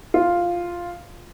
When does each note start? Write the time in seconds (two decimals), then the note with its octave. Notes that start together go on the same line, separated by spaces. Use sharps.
0.14 F4